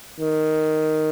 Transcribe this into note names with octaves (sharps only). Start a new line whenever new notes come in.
D#3